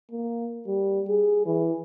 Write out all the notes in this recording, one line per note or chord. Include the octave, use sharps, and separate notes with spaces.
A#3
G3
G#4
E3